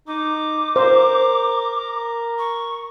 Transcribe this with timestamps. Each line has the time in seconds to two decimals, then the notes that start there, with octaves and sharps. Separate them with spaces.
0.08 D#4 D6
0.76 A#4 C5
2.38 C#6